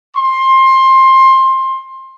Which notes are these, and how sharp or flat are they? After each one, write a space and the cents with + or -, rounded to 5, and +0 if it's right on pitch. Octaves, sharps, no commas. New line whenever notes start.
C6 +20